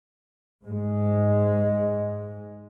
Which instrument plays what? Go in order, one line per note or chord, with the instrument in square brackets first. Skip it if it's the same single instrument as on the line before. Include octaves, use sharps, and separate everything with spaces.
[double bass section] G#2 G#3